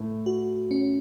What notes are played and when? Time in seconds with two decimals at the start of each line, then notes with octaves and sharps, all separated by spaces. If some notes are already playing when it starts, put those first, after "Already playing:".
Already playing: A2 A3
0.26 F#4
0.71 C#4